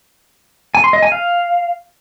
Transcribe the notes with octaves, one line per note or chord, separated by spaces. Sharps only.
G#5
C6
D#5
G#5
F5